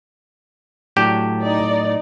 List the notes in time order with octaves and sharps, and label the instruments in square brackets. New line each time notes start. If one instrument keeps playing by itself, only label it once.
[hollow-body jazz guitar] A2 F#3 D4 [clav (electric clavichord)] G4
[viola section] D#4 D5